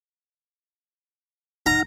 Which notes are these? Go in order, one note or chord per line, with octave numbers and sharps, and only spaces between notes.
D#4 F#5 A#5 F6